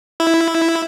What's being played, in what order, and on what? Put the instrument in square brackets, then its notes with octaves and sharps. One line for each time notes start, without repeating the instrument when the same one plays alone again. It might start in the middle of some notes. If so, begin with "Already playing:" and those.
[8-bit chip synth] E4